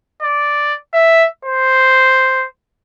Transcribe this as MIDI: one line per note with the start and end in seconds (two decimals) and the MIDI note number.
0.22 0.75 74
0.94 1.27 76
1.45 2.46 72